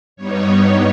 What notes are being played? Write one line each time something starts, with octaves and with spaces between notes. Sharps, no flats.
G2 G3 B3 D#4 C#5